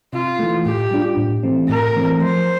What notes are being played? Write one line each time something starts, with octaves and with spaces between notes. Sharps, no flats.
C3 F4
E3 A3
A2 G4
G3 D4 F4
A2
E3 A3 C4
A2 A#4
E3 A3 C4
F3 C5